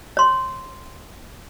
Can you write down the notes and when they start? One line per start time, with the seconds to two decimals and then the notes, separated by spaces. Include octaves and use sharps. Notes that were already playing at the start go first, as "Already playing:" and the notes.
0.17 C#5 C6